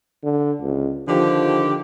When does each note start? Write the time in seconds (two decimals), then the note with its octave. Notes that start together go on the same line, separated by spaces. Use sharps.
0.24 D3
0.61 C#2
1.08 D3 D#3 F3 G4